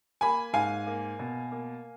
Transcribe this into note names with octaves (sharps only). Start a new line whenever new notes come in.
A#3 G#5 B5
G#2 F5 G#5
A#3
B2
A#3